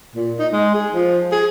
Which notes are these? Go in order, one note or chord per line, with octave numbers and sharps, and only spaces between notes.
A#2
D#4
G#3
G#4
F3
G#4